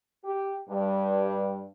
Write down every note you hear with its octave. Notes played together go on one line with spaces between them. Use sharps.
G4
G2